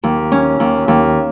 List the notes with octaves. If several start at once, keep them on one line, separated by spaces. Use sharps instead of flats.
D#2
C#4
D#2
D#2